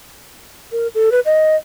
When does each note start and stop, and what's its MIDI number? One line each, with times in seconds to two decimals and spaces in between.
0.72 0.87 70
0.95 1.10 69
1.12 1.20 71
1.25 1.56 75